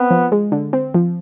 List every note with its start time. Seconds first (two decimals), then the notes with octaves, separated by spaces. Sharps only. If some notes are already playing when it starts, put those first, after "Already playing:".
Already playing: B3 C4
0.11 F3
0.32 G#3
0.52 D3
0.73 C4
0.94 F3